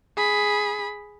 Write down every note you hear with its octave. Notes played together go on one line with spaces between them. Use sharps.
G#4 B5